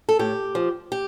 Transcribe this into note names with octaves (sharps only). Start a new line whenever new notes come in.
A4
A2 G4
F3
G4